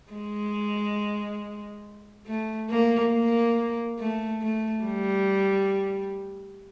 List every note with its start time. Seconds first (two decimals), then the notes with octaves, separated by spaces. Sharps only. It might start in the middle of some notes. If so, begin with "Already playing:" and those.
0.12 G#3
2.26 A3
2.70 A#3
3.13 A#3
3.99 A3
4.41 A3
4.84 G3